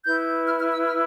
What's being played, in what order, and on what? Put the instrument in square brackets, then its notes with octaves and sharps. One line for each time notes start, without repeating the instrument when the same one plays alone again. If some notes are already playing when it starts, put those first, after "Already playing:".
[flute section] E4 B4 G6
F6
F6
E6
F6